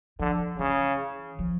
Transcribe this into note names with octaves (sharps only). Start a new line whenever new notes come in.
D3 F3
C#3 E3
F3